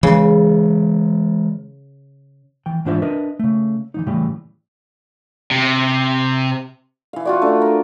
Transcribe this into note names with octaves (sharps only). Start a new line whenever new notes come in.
C#3 E3 G#3
E3 G5
G#2 E3 D4 F4 C5 E5
D4 A#4 B4 D#5 E5
C#3 A3
E3 F3 D#4
A2 C#3 E3 G3 G5
C3
E3 F5
F4 F#4 D5
A3 D4
A#4